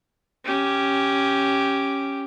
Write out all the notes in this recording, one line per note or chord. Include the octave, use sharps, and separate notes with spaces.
C#4 G4